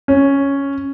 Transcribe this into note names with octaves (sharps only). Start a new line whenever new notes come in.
C#4